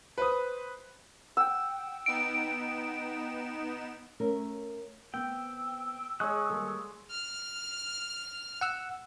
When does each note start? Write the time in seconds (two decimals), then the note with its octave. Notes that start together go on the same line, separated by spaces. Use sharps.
0.18 B4 C5 D#6
1.37 F#5 G5 E6
2.06 B3 D#4 D7 E7
4.20 A3 C#4 A#4
5.14 B3 C4 G5 E6
6.20 G#3 C#5 C#6 D#6 F#6
6.49 D#2 G3 A4
7.11 F6
8.61 F#5 E6